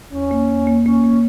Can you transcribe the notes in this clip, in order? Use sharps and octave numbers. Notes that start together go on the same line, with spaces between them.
E2 C#4
A#3
E2
A#3
A#3 C#4
A#3